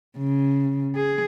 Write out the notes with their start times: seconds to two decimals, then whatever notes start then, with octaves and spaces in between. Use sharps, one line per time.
0.17 C#3
0.95 G#4